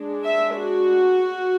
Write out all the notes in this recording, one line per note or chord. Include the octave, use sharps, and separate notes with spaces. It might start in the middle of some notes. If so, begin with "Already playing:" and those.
Already playing: G#3 D4
E5
F#4